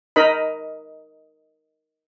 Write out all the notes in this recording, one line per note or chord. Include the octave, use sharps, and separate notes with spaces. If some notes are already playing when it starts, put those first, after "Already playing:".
D#4 A#4 D#5 B5